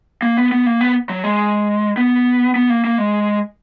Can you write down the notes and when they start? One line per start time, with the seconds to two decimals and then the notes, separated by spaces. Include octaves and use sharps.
0.22 A#3
0.37 B3
0.52 B3
0.66 A#3
0.81 B3
1.09 F#3
1.24 G#3
1.97 B3
2.56 B3
2.70 A#3
2.84 A#3
2.98 G#3